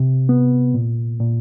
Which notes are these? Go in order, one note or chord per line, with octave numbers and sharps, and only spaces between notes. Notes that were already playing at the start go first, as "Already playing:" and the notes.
Already playing: C3
B3
A#2
A#2